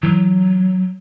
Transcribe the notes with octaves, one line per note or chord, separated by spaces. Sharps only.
E3 F#3